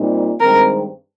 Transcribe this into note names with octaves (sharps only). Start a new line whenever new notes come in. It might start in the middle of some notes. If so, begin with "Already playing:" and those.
Already playing: A#2 G3 C4 D#4
G2 D#3 G#3 C4 A#4